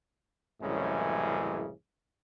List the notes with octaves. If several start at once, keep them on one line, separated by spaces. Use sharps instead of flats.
C2 F#2 A2 C#3 E3 G#3